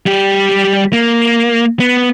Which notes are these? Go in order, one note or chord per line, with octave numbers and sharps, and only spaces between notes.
G3 G4
A#3
B3